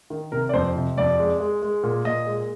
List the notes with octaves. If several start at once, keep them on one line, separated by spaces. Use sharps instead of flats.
D#3
C3 A#4
D5
F2 C5
C3
F2 D5
G#3
G#3
G#3
A#2
A#2 D#5
G#3